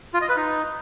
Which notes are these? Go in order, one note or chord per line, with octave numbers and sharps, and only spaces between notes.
F4
D#5
B4
D#4